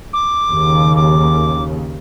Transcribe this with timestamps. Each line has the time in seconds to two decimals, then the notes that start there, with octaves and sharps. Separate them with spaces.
0.13 D6
0.49 D#2 C#3
0.95 D6